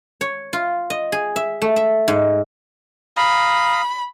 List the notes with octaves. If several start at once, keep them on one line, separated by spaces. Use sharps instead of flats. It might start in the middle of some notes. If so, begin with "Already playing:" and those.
C#5
F4
D#5
G#4
E5
A3
E5
G#2
F5 A#5 B5 D#6